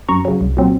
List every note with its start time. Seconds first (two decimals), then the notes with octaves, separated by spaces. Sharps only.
0.09 F#2 A#5 C#6
0.25 C#3 F#3
0.41 C2
0.57 A#2 F#3 C4